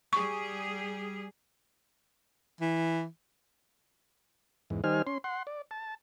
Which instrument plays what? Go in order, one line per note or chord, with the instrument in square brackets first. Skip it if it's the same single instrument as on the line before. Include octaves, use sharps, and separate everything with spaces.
[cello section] G3 G#4 [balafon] C#6
[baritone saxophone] E3
[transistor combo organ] E2 G#2
D#3 G3 D#4 C5 G#5 F6
C#4 C6
F#5 C6
D5
A5